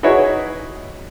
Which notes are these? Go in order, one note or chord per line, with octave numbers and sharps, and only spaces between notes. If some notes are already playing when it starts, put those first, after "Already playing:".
D#4 E4 F#4 G#4 B4 C#5